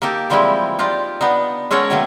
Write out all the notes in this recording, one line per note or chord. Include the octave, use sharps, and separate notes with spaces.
A#3 D#4 G4 A4
E3 F3 G3 G#3 C4 E4
D#4 F4 G4 D5
B3 D4 D#4
G#3 C#4 A4 A#4 C#5 F#5
B2 D#3 F#3 A3 A#3